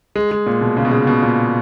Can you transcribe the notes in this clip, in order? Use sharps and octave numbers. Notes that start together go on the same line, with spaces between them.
G#3
G#3
A#2
B2
C#3
B2
C#3
B2
A#2